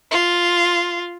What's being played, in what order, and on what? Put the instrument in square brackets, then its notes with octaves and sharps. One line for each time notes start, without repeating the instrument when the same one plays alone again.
[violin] F4